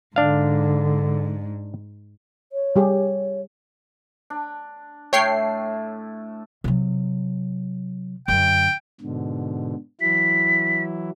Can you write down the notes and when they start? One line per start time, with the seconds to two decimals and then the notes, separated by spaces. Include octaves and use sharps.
0.16 G#2 D3 D4 F5
2.52 C#5
2.76 G3 G4 G#4
4.30 D4
5.13 A2 A3 C#5 G5 C7
6.64 C3 F#3
8.28 F#2 D3 G5
9.01 G#2 B2 D3
10.01 E3 F#3 E4 B6